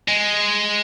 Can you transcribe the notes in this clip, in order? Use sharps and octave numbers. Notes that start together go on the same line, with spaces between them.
G#3